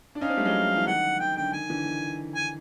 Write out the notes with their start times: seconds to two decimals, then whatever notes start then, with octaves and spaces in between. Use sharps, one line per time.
0.15 D4
0.21 C#4 D#4 F5
0.29 C4 D4
0.37 G3 A3
0.45 F#3 G#3
0.77 E3
0.87 D#3 F#5
1.20 D#3 G5
1.36 D3 G5
1.53 D#3 G#5
1.70 D3 E3
1.86 D#3
2.35 G#5